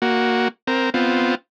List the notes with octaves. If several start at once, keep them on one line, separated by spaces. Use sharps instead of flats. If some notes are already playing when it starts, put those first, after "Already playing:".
A#3 F#4
C4 A#4
B3 C4 F4